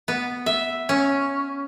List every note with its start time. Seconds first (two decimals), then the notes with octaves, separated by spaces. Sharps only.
0.08 B3
0.46 E5
0.89 C#4